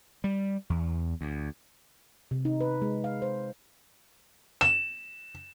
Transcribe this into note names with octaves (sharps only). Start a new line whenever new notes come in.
G3
E2
D2
C3
D#4
B4
G#3
F5
C5
E7